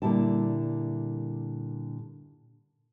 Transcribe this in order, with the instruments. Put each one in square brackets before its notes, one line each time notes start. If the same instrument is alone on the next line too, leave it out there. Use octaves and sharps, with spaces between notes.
[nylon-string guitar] A#2 D3 G3 E4 A5